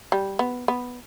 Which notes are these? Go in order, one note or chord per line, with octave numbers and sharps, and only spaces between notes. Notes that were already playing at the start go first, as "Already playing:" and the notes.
G3
B3
B3